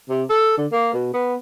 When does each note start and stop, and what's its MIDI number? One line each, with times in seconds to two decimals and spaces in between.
0.09 0.23 48
0.29 0.57 69
0.57 0.66 50
0.71 0.93 58
0.93 1.12 47
1.14 1.35 59